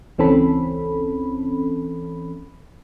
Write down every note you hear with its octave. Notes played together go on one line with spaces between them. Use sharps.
C#2 E3 C4 C#4 A4 B5